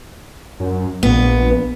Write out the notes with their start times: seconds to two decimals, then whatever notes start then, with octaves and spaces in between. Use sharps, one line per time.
0.60 F#2
1.03 A#1 B3